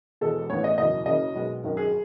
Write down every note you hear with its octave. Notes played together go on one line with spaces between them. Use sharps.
E1 E2 B2 G#3 A4
A1 A2 E3 B3 C#5
D#5
F#1 E2 B2 D#5
F#1 F#2 C#3 D#5
B1 B2 G#3 B3
G#1 F#2 D#3 F#3
G#4